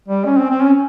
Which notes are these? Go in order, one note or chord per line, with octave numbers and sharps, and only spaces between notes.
G3
C#4
C4
C4
C#4